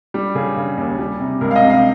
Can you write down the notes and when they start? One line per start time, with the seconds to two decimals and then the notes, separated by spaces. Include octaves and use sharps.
0.14 G3
0.35 C#3 G#4
0.57 C#3
0.77 D#2
0.99 G3
1.20 C3
1.41 C#2 A#4
1.51 F5
1.56 D#5
1.62 C3
1.70 F5